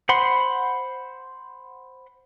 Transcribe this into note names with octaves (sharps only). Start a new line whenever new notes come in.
C5 F#5 B5 C6